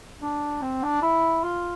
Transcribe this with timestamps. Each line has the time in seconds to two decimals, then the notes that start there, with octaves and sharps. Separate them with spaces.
0.22 D4
0.62 C4
0.83 D4
1.02 E4
1.43 F4